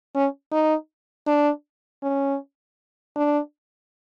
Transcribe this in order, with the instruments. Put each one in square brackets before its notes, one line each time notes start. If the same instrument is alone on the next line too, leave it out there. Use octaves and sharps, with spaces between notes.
[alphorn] C#4
D#4
D4
C#4
D4